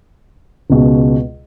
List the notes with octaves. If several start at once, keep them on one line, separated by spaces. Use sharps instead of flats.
C#2 B2 G#3